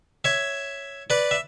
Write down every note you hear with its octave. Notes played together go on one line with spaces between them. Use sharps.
C#5 E5
B4 D5
E5